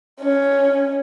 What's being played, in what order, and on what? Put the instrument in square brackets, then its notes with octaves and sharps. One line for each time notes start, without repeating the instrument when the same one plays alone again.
[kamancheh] C#4